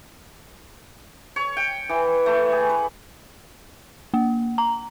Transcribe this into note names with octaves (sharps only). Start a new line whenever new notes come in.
C#5
G5
E3
A3
G#4
B4
A#3
A#5